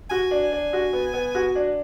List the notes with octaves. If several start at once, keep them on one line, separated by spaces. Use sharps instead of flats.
F#4 G#5
D4
D4
F#4
B3
B3
F#4
D4